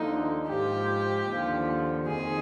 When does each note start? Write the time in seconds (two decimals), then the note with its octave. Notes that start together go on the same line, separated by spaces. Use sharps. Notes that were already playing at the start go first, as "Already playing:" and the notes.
Already playing: D#2 D3 F3 D#4
0.48 G#2 F3 G4
1.28 D#2 D3 F3
2.07 F2 D#3 G#4